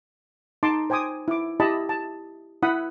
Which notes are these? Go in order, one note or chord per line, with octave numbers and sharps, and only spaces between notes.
D#4 A5 C6 D6
C5 G5 G#5 D6 D#6
E4 D6
E4 G4 D#5 A5 B5
A5
E4 F#5 B5 D#6